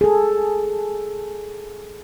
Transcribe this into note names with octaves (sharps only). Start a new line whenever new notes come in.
G#4 A4